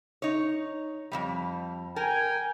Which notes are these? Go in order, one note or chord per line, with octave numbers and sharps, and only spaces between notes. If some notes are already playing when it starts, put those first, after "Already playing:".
D#4 C#5
F2 C3 G3
A#4 G5 G#5